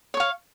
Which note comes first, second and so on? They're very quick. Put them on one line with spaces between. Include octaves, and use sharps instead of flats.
C#5 C#6 F5